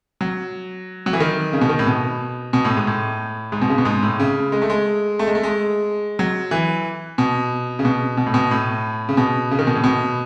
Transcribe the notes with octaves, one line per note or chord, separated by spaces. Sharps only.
F#3
F#3
E3
D#3
C#3
B2
D#3
A2
B2
B2
A2
G#2
A2
G#2
B2
C#3
B2
G#2
A2
C#3
G#3
A3
G#3
A3
G#3
A3
G#3
F#3
E3
B2
C#3
B2
B2
A2
B2
A2
C#3
B2
C#3
D#3
B2
A2
B2